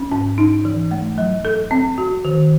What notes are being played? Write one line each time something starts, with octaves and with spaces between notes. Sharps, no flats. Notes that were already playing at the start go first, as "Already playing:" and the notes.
Already playing: C#4
G#2
D#4
E3
A3
F#3
A4
C4
F#4
D#3